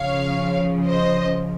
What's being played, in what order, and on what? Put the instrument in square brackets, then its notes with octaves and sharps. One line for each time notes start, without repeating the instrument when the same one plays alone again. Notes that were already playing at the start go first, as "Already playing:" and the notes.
Already playing: [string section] C#3 F3 C#5 F5
C5 D#5